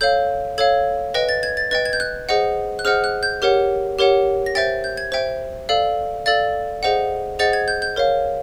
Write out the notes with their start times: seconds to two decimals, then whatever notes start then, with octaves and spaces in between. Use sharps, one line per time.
0.01 A4 C#5 F5 G6
0.58 A4 C#5 F5 G#6
1.14 B4 D#5 G5 A#6
1.29 A6
1.43 G#6
1.57 A6
1.71 B4 D#5 G5 A6
1.85 G#6
1.93 G6
2.00 F#6
2.29 G#4 C5 D#5 F#5
2.79 F#6
2.85 G#4 C5 D#5 F#5 F6
3.04 F#6
3.23 G6
3.42 G4 A#4 C#5 F#5
3.99 G4 A#4 C#5 F#5
4.46 A#6
4.55 C5 E5 G5 A6
4.84 G6
4.97 G#6
5.12 C5 E5 G5
5.69 A4 D5 F5
6.26 A4 D5 F5 A6
6.83 G#4 C5 D#5 F#5
7.39 G#4 C5 D#5 F#5 A6
7.53 G#6
7.68 G6
7.82 G6
7.96 A#4 C#5 F5